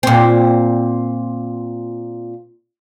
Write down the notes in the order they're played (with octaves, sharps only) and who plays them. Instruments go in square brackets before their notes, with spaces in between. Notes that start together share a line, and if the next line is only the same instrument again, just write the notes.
[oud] A#2 C4